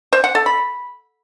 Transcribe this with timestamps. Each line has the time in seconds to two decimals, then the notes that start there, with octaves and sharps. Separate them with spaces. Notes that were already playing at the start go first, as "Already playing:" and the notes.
0.13 C5
0.24 F#5
0.35 A4
0.46 B5